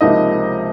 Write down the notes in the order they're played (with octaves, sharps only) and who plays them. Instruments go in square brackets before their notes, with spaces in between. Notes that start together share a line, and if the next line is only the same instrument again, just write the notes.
[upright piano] C#2 C3 F3 A#3 D#4 D#5